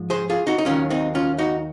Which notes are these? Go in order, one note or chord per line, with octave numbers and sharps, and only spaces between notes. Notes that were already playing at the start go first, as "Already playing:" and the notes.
Already playing: G#2 F3 G#3
G#4 C5
F4 G#4
D#4 F#4
D#4
D#2 D#3 F#3 C#4 F4
C4 D#4
C#4 F4
D#4 F#4